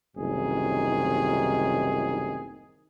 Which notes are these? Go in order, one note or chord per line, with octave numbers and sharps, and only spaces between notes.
F#1 C2 A2 D#3 D#4 G#4